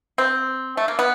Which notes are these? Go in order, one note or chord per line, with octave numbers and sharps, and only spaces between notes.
C4
A3
A#3
B3